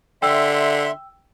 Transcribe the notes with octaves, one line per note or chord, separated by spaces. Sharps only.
D3 E5 G5 C6 E6